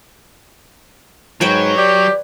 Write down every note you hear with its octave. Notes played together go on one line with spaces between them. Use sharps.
G#2 F#3 B4 C#5 G5
G4 D5